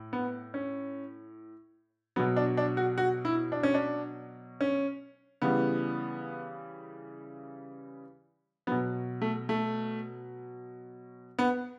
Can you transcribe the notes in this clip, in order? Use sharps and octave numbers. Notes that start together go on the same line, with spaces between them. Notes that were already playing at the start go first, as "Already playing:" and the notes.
Already playing: A2
B3
C#4
B2 F#3 B3
D4
D4
F#4
F#4
E4
D4
C#4
D4
C#4
C#3 E3 G3 B3
B2 F#3 B3
A3
A3
B3